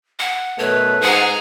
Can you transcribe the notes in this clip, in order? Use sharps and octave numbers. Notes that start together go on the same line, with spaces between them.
F#5
F#2 B2 A3 B4 C#5
G#2 G#4 F#5 A#5